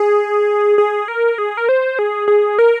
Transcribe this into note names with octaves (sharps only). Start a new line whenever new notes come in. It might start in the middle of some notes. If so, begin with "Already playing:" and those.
Already playing: G#4
G#4
A#4
G#4
A#4
C5
G#4
G#4
A#4